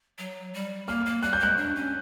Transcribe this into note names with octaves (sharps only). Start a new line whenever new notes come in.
F#3
G3
A#3 F6
A#3
G3 F#6
G6
G#3 F#6
D4
C#4